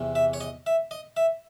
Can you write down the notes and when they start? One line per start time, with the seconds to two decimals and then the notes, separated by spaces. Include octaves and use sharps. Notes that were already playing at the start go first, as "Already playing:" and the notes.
Already playing: E2 C3 E3
0.15 E5
0.34 C#5
0.41 D#5
0.66 E5
0.91 D#5
1.17 E5